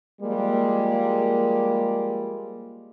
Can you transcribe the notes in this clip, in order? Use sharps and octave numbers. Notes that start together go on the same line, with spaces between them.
F3 G3 G#3 A#3